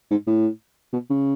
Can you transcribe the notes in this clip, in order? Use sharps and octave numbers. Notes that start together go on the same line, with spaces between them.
G#2
A2
B2
C#3